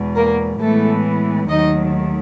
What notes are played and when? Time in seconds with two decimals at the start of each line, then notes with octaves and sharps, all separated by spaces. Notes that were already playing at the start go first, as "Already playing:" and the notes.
Already playing: E2 B2 G#3
0.16 A#3 A#4
0.61 A2 E3 G#3 A3 B3 A4
1.49 D#2 D#3 F#3 A3 D#4 D#5